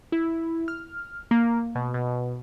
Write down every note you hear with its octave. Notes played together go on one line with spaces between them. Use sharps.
E4
F6
A#3
B2
B2